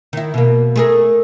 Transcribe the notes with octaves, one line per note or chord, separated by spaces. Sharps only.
D#3 E4
B2 A#3
A3 G#4 A#4